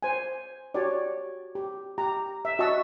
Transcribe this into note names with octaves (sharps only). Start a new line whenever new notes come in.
C5 G#5
F#4 G4 C#5 D5
G4
G4 A#5
E5
F#4 D#5 E5 A5 C#6 E6